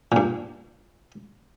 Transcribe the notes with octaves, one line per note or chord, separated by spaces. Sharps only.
G2 A#2